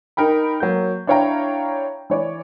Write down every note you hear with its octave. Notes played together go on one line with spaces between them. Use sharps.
D#4 A#4 G5 B5
F#3 A#3 G6
D4 E4 C#5 F5 G5 A#5
E3 C#5 D5